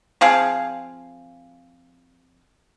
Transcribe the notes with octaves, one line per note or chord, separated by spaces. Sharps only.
F3 C4 G#4 F5